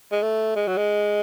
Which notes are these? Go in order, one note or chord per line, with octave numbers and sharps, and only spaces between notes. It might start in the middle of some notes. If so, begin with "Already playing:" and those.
G#3
A3
G#3
F#3
G#3